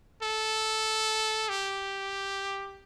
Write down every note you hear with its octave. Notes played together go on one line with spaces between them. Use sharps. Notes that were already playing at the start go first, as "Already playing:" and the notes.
A4
G4